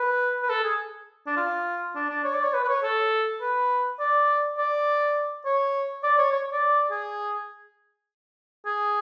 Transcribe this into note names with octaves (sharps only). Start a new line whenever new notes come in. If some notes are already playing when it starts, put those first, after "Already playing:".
Already playing: B4
B4
A4
G#4
D4
F4
D4
D4
C#5
D5
C#5
B4
B4
C#5
A4
B4
D5
D5
C#5
D5
C#5
C#5
D5
G#4
G#4